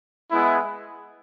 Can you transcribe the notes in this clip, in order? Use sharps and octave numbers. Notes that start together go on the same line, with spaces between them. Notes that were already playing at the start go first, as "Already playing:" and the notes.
G#3 B3 E4